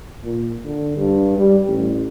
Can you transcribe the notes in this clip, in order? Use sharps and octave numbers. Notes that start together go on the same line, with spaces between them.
A#2
D3
G2
G3
A1